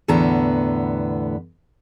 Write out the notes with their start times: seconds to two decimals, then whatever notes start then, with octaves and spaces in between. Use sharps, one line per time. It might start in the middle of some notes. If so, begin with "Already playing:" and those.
0.08 E2 A2 D3 B3 A#5